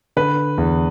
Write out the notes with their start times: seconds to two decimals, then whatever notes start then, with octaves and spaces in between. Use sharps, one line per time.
0.16 D3 B4
0.58 E2